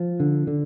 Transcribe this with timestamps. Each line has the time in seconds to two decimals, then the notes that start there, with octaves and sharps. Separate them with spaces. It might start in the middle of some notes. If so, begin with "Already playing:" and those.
Already playing: F3
0.20 D3
0.47 D3